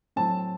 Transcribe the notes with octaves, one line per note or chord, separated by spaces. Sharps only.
A2 F#3 C4 A5